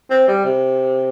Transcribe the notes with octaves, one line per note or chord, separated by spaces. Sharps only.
C4
G3
C3